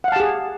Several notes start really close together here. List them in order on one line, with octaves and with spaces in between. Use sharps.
F#5 F5 A5 G4 G#4